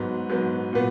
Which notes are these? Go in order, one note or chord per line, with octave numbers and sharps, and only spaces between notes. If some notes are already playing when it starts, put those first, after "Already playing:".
Already playing: G#2 F#3 B3
G#2 F#3 B3
A#2 F#3 B3